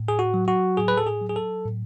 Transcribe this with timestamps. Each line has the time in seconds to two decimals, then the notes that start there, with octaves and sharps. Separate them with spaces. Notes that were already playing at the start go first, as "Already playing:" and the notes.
Already playing: A2
0.08 G#4
0.19 F#4
0.34 F#3
0.48 F#4
0.77 A2 G#4
0.88 B4
0.97 A4
1.07 G#4
1.22 F#3
1.29 G#4
1.36 A4
1.65 A2